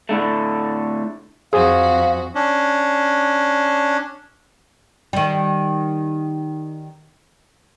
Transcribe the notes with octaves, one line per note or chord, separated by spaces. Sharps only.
A2 D3 A3
F2 F#4 G#4 C5 F5 G#5 D#6
C#4 D4
D#3 G3